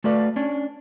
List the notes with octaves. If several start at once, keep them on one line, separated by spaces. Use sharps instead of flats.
A3 F#4 A4 B4 D5 F5
C#4 D4